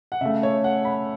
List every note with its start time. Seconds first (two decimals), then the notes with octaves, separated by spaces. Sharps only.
0.12 F#5
0.21 C#3 A3 E5
0.43 C#5
0.64 F#5
0.85 B5